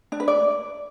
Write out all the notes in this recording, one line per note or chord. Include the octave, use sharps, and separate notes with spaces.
D4
B4
D5